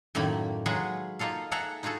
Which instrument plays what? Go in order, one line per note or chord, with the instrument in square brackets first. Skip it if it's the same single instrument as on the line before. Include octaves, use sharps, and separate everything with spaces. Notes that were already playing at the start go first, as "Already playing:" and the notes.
[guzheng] F#2 A2 D#3 A#3 B5
F#3 G#3 F4 G#4 B4
A#3 D#4 F4 A4 F5
G#4 A4 E5 F#5 A#5
D#4 F4 F#4 G#4 A4